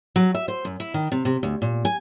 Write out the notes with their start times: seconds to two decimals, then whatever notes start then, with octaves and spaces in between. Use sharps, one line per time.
0.16 F#3
0.34 E5
0.48 C5
0.65 F#2
0.80 E4
0.94 D#3
1.12 C3
1.25 C3
1.43 D2
1.62 A#2
1.85 G#5